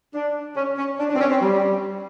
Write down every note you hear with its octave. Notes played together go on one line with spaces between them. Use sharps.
D4
C#4
C#4
D4
D4
C4
C#4
C4
G3